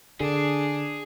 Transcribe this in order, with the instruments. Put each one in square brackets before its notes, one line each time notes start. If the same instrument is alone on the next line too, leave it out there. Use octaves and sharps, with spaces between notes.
[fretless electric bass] D3 [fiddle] D4 [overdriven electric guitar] G#4